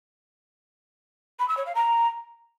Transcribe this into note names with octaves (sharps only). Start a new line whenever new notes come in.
B5
E6
C#5
F5
A#5